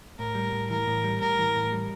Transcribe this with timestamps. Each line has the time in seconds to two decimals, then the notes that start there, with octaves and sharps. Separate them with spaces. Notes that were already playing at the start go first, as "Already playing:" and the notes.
0.19 A2 A#4
0.35 G3
0.53 A2
0.70 E3 A#4
0.87 A2
1.04 G3
1.20 A2 A#4
1.39 E3
1.55 A2
1.72 G3